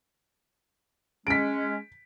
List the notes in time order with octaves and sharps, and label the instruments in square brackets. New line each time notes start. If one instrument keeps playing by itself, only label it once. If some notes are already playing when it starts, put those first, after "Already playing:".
[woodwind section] G#3 C#4 [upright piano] B6 D7